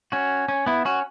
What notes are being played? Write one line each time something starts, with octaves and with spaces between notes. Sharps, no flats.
C#4 F#4
C#4
B3 E4
C#4 F#4